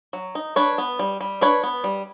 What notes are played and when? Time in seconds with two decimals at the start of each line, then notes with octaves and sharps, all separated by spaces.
0.13 F#3
0.35 D#4
0.56 D4 B4 C#5
0.78 B3
0.99 G3
1.21 G3
1.41 D4 B4 C#5
1.63 B3
1.84 G3